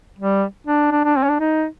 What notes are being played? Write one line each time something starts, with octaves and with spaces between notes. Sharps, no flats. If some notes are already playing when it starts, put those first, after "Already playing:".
G3
D4
D4
D4
C4
C#4
D4
D#4